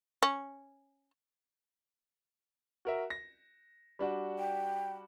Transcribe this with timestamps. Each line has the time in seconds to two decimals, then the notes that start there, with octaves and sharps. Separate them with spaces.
0.23 C#4
2.85 F#4 A#4 E5
3.10 A#6
3.99 G3 D4 F#4
4.39 G5